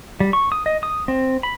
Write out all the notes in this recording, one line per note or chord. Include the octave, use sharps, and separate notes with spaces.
G3
C#6
D#6
D#5
D#6
C4
B5